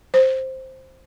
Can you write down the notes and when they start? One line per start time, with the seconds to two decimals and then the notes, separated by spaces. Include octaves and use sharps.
0.14 C5